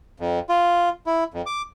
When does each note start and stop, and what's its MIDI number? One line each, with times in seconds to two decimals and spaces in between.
0.20 0.39 41
0.49 0.89 65
1.07 1.24 64
1.34 1.42 41
1.46 1.62 86